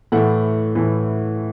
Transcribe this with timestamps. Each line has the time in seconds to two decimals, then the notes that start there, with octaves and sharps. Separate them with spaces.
0.12 A2 E3 A3 F#5
0.75 A2 E3 A3